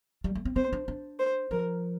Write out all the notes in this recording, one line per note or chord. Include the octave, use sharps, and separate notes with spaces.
G3
A3
C4
C4 C5
D4
D4
C5
F3 A#4